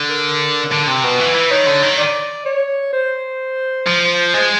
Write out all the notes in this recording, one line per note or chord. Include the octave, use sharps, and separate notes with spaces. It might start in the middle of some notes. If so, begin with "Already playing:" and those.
Already playing: D3
A#4
D3
C3
B2 B4
E3
E3
D#3 C#5
D3
D#3
D5
C#5
C5
F3
G#3